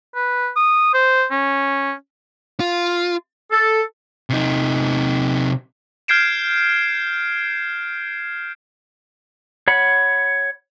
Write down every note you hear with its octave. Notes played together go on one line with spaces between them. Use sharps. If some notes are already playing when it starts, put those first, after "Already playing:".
B4
D#6
C5
C#4
F4
A4
C3 D#4
F6 G6 G#6 C7 D7 E7
C#5 F#5 B5